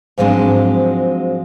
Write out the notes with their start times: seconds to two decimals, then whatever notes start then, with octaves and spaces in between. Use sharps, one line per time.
0.18 G#2 F3 F#3 G#3 C4 D4